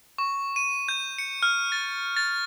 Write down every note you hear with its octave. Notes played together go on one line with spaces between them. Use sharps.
C#6
D#7
G6
C#7
F6
A6
A6